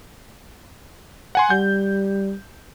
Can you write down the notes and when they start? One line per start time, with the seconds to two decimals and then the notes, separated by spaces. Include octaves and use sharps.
1.35 F#5 G#5 C6
1.50 G3 G6